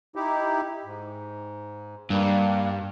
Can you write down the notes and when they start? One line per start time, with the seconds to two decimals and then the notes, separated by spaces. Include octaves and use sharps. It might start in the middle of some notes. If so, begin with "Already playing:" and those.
0.16 D#4 E4 G4
0.85 G#2
2.10 G2 G3 A#3